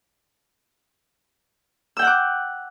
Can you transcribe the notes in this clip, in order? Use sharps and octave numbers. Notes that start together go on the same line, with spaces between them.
F#5 G5 D6 E6 F#6